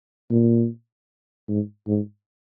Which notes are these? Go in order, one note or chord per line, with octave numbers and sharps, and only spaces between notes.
A#2
G#2
G#2